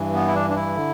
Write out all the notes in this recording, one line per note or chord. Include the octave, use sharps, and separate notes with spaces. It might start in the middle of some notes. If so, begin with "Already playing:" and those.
Already playing: G2 E3
B3
E4
D4
D4
E4
D3